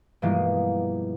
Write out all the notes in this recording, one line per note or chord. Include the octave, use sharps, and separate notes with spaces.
G2 B2 E3 F3 G#3 A#3